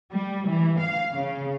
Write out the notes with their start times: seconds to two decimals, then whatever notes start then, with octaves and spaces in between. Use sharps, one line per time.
0.12 G3
0.48 E3
0.80 F5
1.13 C#3